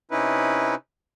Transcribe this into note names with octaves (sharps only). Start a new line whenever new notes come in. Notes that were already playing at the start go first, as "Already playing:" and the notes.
C3 C#4 D#4 E4 B4